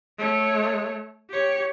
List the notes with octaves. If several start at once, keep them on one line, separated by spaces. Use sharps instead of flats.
A3 C#5
G4 C#5